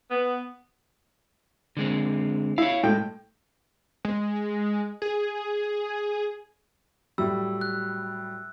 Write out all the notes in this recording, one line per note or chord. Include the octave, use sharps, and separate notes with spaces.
B3
D3 G#3 C4
E4 C#5 F5
A2 G#3 G5
G#3
G#4
A2 F#3 G3 E6
F#6